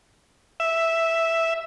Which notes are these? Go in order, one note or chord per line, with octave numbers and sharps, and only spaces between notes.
E5